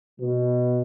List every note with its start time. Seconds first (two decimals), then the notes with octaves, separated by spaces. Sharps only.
0.19 B2